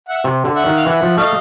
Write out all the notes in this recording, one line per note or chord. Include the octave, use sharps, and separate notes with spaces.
E5 F#5
C3
D3
E5 F#5
D#3
F5
E3 E5 F#5
F3
A3 D#5 F5